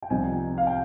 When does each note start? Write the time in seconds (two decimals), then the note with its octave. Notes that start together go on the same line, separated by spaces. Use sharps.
0.02 G5
0.10 C2 C3 F3 C4 D#4 G#5
0.58 F5
0.67 G5